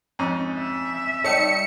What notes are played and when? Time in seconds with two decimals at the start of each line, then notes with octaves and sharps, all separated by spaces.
0.19 F2 G#2 C#4
0.59 E5
1.24 G3 D#4 C#5 A5 C#7